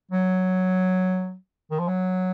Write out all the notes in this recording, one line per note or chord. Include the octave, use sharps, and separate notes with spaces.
F#3
D#3
F3
F#3